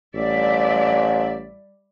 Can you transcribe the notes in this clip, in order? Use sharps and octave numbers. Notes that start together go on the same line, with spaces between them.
A1 G3 D5 E5